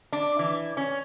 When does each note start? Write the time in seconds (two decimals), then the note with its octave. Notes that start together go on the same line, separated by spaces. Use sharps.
0.12 D4
0.39 E3
0.77 C#4